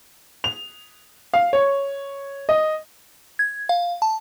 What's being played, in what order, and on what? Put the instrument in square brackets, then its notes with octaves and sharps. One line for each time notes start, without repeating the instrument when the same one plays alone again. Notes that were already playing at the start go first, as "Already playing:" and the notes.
[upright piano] F7
F5
C#5
D#5
[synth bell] G#6
F5
A5